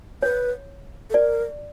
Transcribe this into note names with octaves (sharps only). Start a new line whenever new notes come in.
B4 C#5
A4
A#4 D5